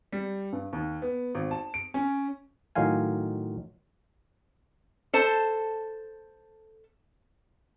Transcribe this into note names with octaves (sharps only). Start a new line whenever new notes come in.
G3
G2
D#2
B3
G#1
A5
D7
C#4
A2 D#3 F#3 F4 F5 G#5
A4 C5 A5